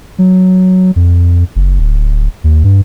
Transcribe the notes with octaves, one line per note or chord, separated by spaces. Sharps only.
F#3
F2
F#1
D1
D#2
G2